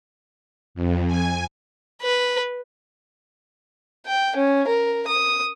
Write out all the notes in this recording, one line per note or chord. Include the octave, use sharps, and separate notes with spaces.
F2
G#5
B4
G5
C#4
A#4
D#6